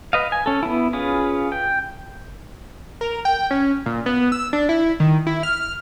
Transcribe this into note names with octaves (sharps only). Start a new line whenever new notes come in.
B4 D#5 F5
G#5
C#4 A4
B3 E4
C#4 F4 G#4 B4
G5
A#4
G5
C#4
A#2
B3
E6
D4
E4
D#3
E4
F6